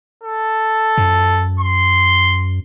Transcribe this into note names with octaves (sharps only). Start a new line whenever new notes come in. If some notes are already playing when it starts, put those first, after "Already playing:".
A4
F#2
C6